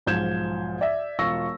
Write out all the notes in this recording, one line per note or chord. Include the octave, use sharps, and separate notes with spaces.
B1 G#2 F3 G6 G#6 E7
D5 E5
E1 F4 C#6 E6 A#6